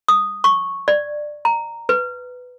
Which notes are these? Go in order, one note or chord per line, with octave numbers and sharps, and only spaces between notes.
D#6
C#6
D5
A#5
B4